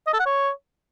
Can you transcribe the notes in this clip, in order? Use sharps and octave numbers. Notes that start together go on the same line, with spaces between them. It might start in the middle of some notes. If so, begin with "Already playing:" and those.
D#5
A4
F#5
C#5